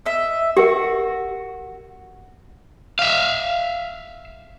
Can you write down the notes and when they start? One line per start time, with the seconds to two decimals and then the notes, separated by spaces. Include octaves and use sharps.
0.06 D#5 E5
0.57 F#4 G4 A#4
2.99 E5 F5